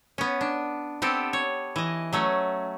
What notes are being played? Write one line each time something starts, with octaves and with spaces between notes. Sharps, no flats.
B3 C#4
D4
B3 C4 G4 A4
C#5
E3 D#5
F#3 A3 C#4